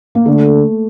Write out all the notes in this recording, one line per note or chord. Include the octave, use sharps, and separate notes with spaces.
A#3
D3 A3